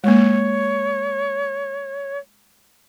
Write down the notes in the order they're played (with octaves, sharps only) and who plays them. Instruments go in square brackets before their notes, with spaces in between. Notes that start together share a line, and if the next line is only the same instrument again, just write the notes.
[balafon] G#3 A#3 [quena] C#5